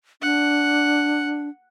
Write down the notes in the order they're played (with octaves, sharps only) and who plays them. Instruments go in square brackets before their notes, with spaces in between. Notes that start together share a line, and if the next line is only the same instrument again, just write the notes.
[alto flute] D4 [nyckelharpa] F#5